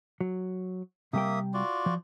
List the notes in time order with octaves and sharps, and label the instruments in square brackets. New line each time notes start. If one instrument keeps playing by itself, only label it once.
[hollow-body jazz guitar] F#3
[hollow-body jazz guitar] C3 G3 G5 [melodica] A#3 E5 D#6
[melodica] F4 F#4 D5
[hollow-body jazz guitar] F3